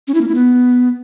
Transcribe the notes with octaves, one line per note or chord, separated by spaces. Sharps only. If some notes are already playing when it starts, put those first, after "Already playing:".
C#4
E4
A#3
E4
B3